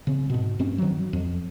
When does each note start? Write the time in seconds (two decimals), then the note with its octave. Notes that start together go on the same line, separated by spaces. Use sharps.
0.07 C#3 C4
0.30 G#2 B2
0.59 G2 C4 C#4
0.78 D#3 F#3
1.13 F2